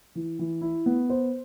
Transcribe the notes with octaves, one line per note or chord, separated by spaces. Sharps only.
E3
E3
E4
B3
C5